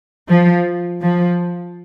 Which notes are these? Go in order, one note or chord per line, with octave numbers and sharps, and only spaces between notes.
F3
F3